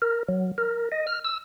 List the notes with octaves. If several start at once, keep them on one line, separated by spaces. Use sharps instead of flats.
A#4
F#3
A#4
D#5
F6
E6